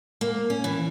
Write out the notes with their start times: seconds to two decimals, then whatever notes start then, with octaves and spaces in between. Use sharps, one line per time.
0.21 A#3
0.50 C#4
0.64 E3